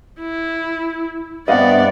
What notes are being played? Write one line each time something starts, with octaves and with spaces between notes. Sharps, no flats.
E4
G2 C3 B3 D5 D#5 F5 F#5